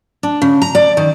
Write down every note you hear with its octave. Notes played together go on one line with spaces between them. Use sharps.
D4
C#3
A#5
D5
D#3